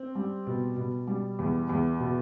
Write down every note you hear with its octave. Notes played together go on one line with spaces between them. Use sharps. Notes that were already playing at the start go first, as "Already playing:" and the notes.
Already playing: C4
G3
B2
B2
G3
E2
E2
B2